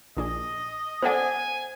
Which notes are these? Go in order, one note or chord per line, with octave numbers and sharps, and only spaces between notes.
A#1 D4 G#4 D#5
B3 A4 C5 D5 F#5 G#5